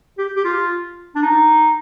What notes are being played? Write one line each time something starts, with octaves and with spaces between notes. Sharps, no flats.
G4
G4
F4
D4
D#4